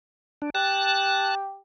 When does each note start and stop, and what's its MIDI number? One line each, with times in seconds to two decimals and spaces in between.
0.42 0.50 62
0.55 1.58 67
0.55 1.35 81
0.55 1.35 90